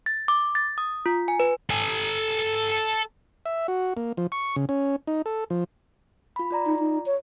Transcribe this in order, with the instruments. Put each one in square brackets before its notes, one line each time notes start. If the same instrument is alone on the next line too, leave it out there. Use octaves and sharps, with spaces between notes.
[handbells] A6
D6
A6
D#6
F4
G#5
B4
[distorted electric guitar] A4 G#5
[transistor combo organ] E5
F#4
A#3
F3
C#6
C#3
C#4
D#4
A4
F3
[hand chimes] F4 B5
F4 D5 A#5
[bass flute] D#4
D#4
C#5